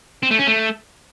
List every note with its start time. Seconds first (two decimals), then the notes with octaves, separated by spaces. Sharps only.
0.23 C4
0.31 A3
0.39 C#4
0.47 A3